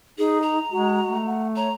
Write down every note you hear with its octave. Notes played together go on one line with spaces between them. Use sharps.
D#4 G#4
A#5
G#3 F#4
A3
F#5
C#5 A#5